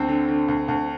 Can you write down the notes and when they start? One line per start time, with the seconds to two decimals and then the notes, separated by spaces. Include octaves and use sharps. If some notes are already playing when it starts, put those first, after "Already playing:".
Already playing: D2 C4
0.08 D3
0.28 D3
0.48 D2
0.68 D2